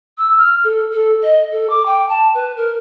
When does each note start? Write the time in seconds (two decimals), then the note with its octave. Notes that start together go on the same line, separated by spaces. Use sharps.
0.18 E6
0.38 F6
0.64 A4
0.92 A4
1.23 D#5
1.52 A4
1.70 D6
1.86 G5
2.09 A5
2.34 B4
2.57 A#4